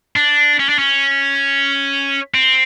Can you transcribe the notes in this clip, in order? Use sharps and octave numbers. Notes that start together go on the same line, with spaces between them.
D4
C#4
D4
C#4
C4